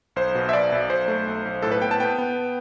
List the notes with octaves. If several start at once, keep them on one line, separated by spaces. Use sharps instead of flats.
B1 C5
B2
E5
B1 D5
B1
B1 C5
A3
B1
B1
A2 A4
B4
B3 G5
A5
B3 G5
B3